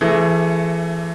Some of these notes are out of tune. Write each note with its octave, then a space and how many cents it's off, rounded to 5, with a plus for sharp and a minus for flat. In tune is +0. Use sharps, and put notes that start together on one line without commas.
E3 +30 A3 +0 G#4 +0